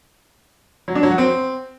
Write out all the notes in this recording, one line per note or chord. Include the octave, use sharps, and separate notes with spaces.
F#3
D4
F#3
F#4
C4